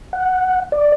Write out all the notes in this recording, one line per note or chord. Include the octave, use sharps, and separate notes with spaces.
F#5
D5